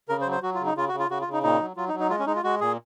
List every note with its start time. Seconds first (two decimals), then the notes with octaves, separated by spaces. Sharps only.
0.09 C#3 A#4
0.21 C5
0.26 F#3
0.32 C5
0.42 F#3 F#4
0.54 F4
0.60 C#3
0.66 D#4
0.76 C#3 F4
0.88 F#4
0.93 C#3
0.99 F4
1.10 C#3 F#4
1.21 F4
1.27 C#3
1.32 D#4
1.43 A#2 D#4
1.61 F#3
1.76 F#3 F4
1.88 D#4
1.94 F#3
2.00 D#4
2.10 G#3 F4
2.19 C#4
2.27 G#3 D#4
2.36 F4
2.43 G#3 F#4
2.61 A#2 G#4